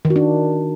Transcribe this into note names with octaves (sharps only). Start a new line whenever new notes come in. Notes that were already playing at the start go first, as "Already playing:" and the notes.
D#3
F#4
D4